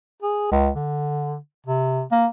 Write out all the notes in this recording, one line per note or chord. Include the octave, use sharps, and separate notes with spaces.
G#4
C#2
D3
C3
A#3